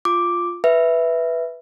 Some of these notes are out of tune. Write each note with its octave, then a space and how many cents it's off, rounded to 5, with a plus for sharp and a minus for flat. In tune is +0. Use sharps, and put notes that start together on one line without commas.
F4 +0 D6 +0
B4 +0 E5 +0